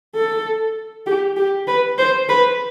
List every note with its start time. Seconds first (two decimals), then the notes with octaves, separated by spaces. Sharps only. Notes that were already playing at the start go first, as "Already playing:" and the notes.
0.15 A4
1.06 G4
1.37 G4
1.67 B4
1.98 C5
2.29 B4